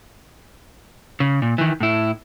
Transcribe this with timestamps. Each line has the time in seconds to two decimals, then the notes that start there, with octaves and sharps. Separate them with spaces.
1.20 C#3
1.42 A#2
1.58 D#3 E3
1.80 A2 E4